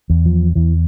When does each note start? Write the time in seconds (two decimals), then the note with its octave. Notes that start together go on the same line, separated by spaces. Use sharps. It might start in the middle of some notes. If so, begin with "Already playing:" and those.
0.10 E2
0.26 F3
0.55 E2 E3